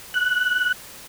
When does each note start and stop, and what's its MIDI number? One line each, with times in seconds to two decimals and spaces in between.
0.14 0.72 90